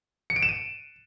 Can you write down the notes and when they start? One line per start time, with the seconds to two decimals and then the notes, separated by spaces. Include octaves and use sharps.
0.30 C#7
0.36 D7
0.43 E7
0.49 D#7